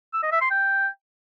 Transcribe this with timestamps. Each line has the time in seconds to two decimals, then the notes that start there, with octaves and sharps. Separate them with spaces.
0.13 E6
0.23 D#5
0.32 E5
0.41 C6
0.50 G5